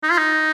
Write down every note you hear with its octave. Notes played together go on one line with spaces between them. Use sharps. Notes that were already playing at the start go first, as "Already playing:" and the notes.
D#4
F4
D#4